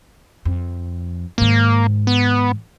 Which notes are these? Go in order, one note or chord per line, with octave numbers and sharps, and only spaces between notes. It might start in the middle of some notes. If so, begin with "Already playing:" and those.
F2
G#2 D#3 A#3
B3